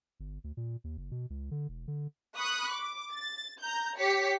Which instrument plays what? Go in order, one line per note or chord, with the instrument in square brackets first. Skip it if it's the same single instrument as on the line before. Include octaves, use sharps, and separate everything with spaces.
[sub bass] G1
D2
A#2
D#2
F#1
B2
C#2
D3
E1
D3
[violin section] B5 C#6 D#6 F#6
D6
A6
A#5 G6
G4 C#5 B6 C#7